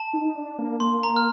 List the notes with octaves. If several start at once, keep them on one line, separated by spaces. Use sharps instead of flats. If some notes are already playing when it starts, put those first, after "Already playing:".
Already playing: A5
D#4
D4
A#3
A#3 C6
A#5
F6